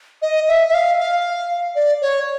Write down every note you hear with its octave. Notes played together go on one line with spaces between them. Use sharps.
D#5
E5
E5
F5
F5
D5
C#5